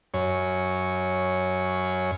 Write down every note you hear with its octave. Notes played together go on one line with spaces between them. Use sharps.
F#2 C#5